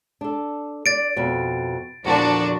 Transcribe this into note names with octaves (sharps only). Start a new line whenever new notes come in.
D4 A4
D5 A6 D7
F2 B2
E2 A#2 D3 F3 D4 F#4